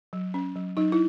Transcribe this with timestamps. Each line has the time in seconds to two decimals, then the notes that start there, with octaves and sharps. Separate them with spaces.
0.13 F#3
0.34 C#4
0.55 F#3
0.77 F#3 D#4
0.92 E4